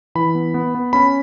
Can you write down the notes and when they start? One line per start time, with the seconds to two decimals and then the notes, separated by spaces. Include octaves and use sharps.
0.15 E3 B5
0.35 B3
0.54 B3
0.75 B3
0.93 C#4 B5